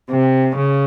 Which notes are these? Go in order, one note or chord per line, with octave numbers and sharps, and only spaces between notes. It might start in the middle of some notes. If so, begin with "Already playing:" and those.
C3
C#3